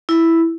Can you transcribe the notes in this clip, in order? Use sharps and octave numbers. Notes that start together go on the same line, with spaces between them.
E4